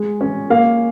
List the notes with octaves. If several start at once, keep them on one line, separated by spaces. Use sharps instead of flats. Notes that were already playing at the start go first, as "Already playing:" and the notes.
Already playing: G#3
C#4
A#3 F5